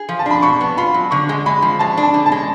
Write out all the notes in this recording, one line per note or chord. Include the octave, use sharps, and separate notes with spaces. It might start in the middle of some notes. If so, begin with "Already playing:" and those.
Already playing: G#4
F3
A5
D4 B5
B2 C#6
B3
F4 B5
F#3
D3 C#6
G#3
G#3 B5
F3
G#3 A5
D4
A5
D3
A5
G#3